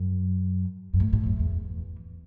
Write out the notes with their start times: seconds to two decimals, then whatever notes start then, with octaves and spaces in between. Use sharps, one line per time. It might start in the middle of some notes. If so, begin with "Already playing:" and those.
Already playing: F#2
0.94 F#2
1.00 A2
1.13 A2
1.26 F#2
1.39 E2